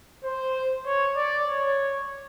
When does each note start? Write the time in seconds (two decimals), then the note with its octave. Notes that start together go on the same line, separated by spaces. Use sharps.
0.24 C5
0.86 C#5
1.16 D5
1.47 C#5